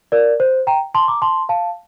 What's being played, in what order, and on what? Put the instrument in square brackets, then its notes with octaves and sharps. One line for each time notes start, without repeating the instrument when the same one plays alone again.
[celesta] A#4 D5
C5
G5 A#5
A5 C6
A#5 D6
A5 C6
F5 A5